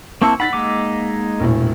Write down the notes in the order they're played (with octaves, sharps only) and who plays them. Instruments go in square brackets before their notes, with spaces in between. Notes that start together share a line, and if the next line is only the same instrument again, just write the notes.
[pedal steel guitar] A#3 C4 E4 [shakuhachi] A5 [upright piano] C#6 E6 C#7
[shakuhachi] D#4 [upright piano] F#5 A6 B6 [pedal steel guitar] B5
[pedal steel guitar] G#3 D#4 D6 [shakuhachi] A#3
[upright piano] E1 A#1 A2